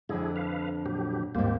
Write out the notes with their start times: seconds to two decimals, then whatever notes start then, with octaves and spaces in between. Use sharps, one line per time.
0.09 F2 D3 G#3 E4 G#4
0.36 B4 F5
0.86 A#2 F#3 G4
1.35 D#2 G#2 A#3 C4 G4